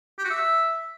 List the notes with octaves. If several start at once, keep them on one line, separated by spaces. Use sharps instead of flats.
G4
F#4
E5